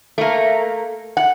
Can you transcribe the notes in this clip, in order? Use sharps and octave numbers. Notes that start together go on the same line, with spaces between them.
A3 A#3
F#5